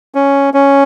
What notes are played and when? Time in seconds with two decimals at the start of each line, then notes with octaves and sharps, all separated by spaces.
0.15 C#4
0.54 C#4